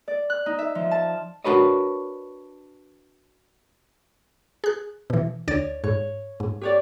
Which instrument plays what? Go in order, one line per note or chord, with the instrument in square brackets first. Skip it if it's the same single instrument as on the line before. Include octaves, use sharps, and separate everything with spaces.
[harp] D5
F#6
D#4
E5
F3
A5
[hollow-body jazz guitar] D4 F#4 A#4 B4 C#5 D#5
[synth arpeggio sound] G#4 F#6
B2 E3
[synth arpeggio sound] D2 D5 A6 [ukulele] C#5
[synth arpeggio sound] G#2 [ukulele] C#5
[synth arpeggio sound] G#2
[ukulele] G4 C#5 D5